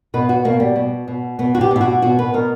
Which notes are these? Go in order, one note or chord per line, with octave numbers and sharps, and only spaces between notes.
B2 B4
F#4
B2 A#3
G3
B2
B2
B2 B3
F#4
G4
B2 E4
F#4
B2 F#4
B4
B2 A#4